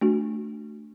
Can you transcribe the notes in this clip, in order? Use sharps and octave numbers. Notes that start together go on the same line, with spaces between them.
A3 D4 F#4